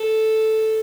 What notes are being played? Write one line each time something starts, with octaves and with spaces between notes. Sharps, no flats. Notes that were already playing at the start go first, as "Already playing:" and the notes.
Already playing: A4